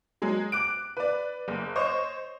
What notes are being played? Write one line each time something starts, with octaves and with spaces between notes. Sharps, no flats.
F#3 G#3
D6 F#6 D7
B4 D5
F#1
C5 C#5 D#5 C#6